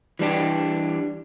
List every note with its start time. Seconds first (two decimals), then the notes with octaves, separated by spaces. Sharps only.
0.19 E3 G3 D4 G4